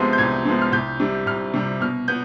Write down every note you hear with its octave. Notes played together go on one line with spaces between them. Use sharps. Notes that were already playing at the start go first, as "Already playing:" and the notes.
Already playing: C2 C3 F3 G#3 B3 C6
G6
C2 G#6
C3 F3 G#3 B3
F6
C2 G6
C3 G3
C2 F6
C3 G3
B2 F6
B3 G6